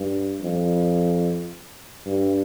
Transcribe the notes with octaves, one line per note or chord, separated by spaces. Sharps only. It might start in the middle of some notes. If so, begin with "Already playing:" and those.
Already playing: G2
F2
G2